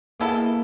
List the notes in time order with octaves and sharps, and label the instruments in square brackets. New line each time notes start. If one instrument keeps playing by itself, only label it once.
[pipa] G#3 B3 E4 A4 [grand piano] A#3